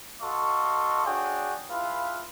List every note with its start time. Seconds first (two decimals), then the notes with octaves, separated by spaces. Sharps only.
0.22 F#4 A4 D#5 F5 C6 C#6
1.06 D4 F#4 G#4 C#5 D5 G5
1.70 E4 F4 G#4 B4 F5